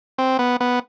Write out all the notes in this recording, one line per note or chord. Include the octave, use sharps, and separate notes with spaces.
C4
B3
B3